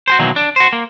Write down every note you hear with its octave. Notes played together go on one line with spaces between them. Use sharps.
F#4 G#4 C5
B2 D#3 E3 F#3 A#3
D4
F#4 C5
A#3